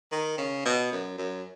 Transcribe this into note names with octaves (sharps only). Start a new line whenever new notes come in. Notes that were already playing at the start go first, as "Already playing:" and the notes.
D#3
C#3
B2
F#2
F#2